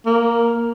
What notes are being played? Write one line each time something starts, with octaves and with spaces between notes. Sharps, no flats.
A#3